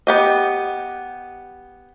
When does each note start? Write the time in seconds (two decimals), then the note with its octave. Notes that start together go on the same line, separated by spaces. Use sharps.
0.07 B3 G4 D#5